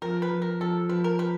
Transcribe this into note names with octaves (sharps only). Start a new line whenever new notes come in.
F3 A#4
B4
F3
A#4
F3 A4
F3 B4
A#4
B4